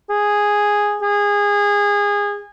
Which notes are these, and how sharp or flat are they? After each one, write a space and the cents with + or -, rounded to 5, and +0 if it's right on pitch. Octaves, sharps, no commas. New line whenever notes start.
G#4 -5
G#4 -25